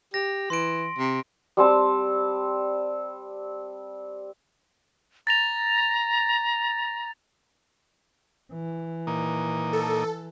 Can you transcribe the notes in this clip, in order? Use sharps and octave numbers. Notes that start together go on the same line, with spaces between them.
G4 A#6
E3 C6 D7
C3
G3 C4 A5
A#5 A6 A#6 F7
E3
A#2 A#3 D#4
A4